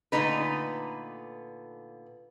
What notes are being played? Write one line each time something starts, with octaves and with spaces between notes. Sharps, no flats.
A#2 D3 A3 B3 D#4 B4